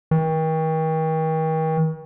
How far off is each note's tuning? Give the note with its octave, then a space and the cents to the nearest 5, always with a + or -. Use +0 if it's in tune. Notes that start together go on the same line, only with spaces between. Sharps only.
D#3 +40